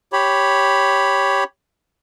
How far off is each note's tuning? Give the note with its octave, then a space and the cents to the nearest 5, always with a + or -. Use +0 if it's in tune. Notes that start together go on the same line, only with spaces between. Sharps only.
G4 +0 C#5 +0 B5 +0